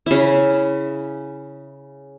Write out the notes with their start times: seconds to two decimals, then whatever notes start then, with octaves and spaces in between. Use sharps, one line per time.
0.06 C#3 E4